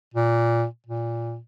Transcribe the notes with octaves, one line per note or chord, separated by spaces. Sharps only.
A#2
A#2